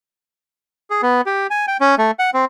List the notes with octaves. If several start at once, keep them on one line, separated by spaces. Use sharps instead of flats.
G#4
B3
G4
G#5
G5
C#4
A3
F#5
C4